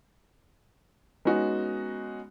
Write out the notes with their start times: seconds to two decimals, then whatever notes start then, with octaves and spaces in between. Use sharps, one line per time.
1.25 G#3 B3 C#4 D#4 F#4